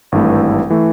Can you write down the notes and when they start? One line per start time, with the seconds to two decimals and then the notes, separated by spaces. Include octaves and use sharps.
0.12 G#1 G2 E3 A3
0.70 E3 A3